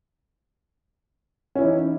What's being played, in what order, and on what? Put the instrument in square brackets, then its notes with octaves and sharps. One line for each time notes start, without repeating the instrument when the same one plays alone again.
[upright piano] C#4
E4
E3
D#4